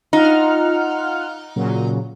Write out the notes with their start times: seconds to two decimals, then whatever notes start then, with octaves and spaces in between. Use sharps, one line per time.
0.13 D#4 F4 F#5 F6
1.56 A#2 C#3 F#3